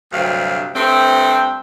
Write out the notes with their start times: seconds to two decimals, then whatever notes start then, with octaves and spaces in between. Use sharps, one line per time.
0.12 D2 G2 C3 F#3 F5
0.75 G2 A3 C4